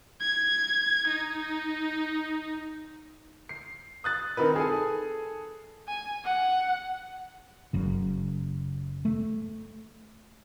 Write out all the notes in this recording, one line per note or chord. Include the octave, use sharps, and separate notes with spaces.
G#6
D#4
C7
D#6 F#6 A6
D#3 C4 A#4 B4
G#4 A4 G#5
G#5
F#5
F#1 F#2 C#3
A3